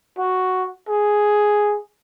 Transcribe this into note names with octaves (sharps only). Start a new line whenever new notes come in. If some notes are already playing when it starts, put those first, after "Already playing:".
F#4
G#4